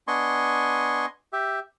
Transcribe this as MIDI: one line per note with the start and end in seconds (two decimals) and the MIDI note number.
0.08 1.06 59
0.08 1.06 62
0.08 1.06 75
0.08 1.06 80
0.08 1.06 84
0.08 1.06 85
1.33 1.59 67
1.33 1.59 76